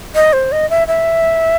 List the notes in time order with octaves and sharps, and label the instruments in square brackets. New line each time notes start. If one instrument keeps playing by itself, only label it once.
[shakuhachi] D#5
C5
D#5
E5
E5